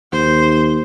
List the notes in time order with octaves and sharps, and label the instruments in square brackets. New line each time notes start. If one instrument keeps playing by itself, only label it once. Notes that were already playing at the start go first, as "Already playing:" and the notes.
[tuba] D#2 [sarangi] C5